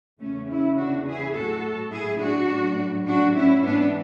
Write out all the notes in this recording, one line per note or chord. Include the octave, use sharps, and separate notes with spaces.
E2 C#3 E3 A3 C#4
C#4 E4
D4 F#4
E4 G#4
A2 F#3 F#4 A4
E4 G#4
D4 F#4
A2 F#3
D4 F#4
C#4 E4
G#2 E3 B3 D4